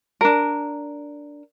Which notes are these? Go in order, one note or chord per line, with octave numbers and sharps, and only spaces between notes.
D4 A#4